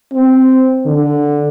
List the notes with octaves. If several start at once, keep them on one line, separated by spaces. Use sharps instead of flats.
C4
D3